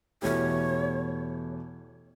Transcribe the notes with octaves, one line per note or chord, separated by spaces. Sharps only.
E2 B2 A3 E4 G4 C#5